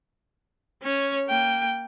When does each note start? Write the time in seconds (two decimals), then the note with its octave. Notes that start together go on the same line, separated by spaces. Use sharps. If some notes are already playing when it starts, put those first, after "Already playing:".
0.83 C#4 C#5
1.28 A#3 G5